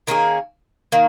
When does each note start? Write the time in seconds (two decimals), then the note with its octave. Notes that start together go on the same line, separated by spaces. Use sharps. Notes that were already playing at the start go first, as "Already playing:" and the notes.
0.07 D#3 A#3 C#4 G#4
0.92 D#3 A#3